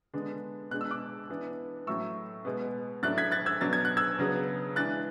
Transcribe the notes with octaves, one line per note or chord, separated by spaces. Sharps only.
D3 G#3 B3 D4
B2 G#3 D4 F#6
E6
D6 F#6
E3 B3 D4
A2 F#3 A3 C#6 E6
B2 G#3 B3
A2 F#3 A3 D4 F#6 A6
G#6 B6
F#6 A6
E6 G#6
B2 F#3 B3 D4 A6
G#6
F#6
E6 G#6
C#3 F#3 B3 D4
E3 G#3 D4 F#6 A6